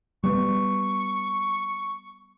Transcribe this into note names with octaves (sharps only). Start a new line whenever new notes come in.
G3 B3 C#6